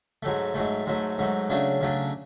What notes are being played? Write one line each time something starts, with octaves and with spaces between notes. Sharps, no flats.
G#2 F#3 A3
G#2 F#3 A3
G#2 F#3 A3
G#2 F#3 A3
C#3 F#3 A3 D4
C#3 F#3 A3 D4